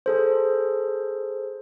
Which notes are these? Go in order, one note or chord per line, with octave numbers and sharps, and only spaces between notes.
G#4 A4 C5